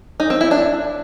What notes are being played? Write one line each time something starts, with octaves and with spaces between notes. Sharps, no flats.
D#4
C4
E4
D4